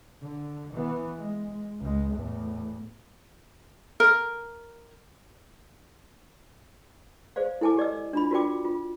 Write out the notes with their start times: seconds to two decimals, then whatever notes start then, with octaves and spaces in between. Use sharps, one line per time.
0.22 D3
0.74 E3 B3
1.18 G#3
1.80 C#2 G#3
2.15 E2 A2
4.00 A#4
7.36 G#4 C5 D5 F5
7.61 E4 A4 G#5 A5 D6
7.77 G4 D5 D#5 E6
8.13 D4 F4 B5
8.31 F4 F#4 A#4 D5 G5 D6
8.65 F4